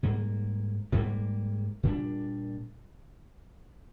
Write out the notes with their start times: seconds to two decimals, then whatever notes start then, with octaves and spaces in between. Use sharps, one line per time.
0.03 G#2 G3 A#3
0.92 G#2 G3 A#3
1.83 A#2 G3 D4